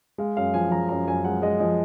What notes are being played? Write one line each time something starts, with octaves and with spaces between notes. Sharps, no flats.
G#3 F5
F#2 F5
F3 G#5
F3 A#5
F#2 A#5
F#2 G#5
G#3 F#5
G#3 D#5
F3 D#5